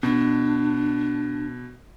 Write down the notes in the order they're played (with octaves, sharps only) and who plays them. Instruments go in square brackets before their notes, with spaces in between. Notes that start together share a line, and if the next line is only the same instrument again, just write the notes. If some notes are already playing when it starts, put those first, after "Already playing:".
[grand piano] B2 [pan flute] D4